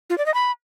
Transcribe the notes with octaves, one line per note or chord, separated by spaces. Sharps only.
F4
D5
D#5
B5